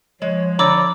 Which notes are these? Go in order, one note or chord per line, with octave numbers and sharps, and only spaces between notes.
F3 G#3 C#5
D3 D5 A#5 B5 D6 E6